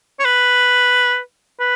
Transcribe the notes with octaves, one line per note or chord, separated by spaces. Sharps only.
C#5
B4
B4